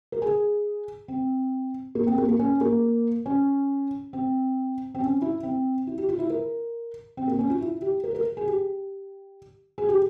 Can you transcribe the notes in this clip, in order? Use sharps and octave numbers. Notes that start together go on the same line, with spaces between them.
A#4
G#4
C4
A#3
C4
A#3
A#3
C#4
A#3
C#4
C4
C4
C#4
E4
C4
E4
G4
F4
E4
A#4
C4
A#3
C#4
F4
E4
G4
A#4
A#4
G#4
G4
G#4
G4